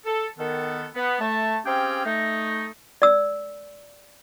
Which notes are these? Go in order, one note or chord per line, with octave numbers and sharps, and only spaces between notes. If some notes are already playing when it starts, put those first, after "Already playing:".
A4
D#3 B3 A4
B3
A3 A5
C4 C#4 G4 G#4 F5 G5
A3 D#4
D5 E6